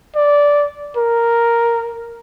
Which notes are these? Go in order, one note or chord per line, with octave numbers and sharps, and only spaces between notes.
D5
A#4